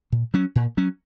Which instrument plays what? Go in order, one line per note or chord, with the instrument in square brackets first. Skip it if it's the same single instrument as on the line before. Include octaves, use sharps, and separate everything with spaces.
[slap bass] A#2
F#3 C#4
A#2
F#3 C#4